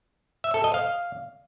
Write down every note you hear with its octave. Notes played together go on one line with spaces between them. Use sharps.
E5
A4
D#5
F5